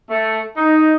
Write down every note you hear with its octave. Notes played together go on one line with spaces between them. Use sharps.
A3
D#4